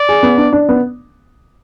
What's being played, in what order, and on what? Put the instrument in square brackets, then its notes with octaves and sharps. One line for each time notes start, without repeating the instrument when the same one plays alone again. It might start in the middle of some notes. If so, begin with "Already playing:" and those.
Already playing: [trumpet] D5
[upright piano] G#4
B3
D4
D4
B3